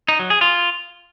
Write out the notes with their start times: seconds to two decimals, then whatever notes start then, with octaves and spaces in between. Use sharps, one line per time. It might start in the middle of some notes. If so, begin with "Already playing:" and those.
0.08 D#4
0.19 F#3
0.30 G#4
0.41 F4